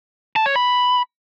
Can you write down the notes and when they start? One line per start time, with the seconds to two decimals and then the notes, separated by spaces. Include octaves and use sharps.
0.36 A5
0.46 C#5
0.56 B5